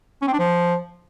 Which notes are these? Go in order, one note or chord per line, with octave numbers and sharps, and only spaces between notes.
C#4
C4
D4
F3